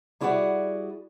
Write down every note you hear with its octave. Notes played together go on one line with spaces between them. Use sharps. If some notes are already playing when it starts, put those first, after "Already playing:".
G3 E4 F#4 G#4 D5 F#5